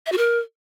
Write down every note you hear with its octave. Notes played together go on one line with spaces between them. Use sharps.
E5
F#4
A#4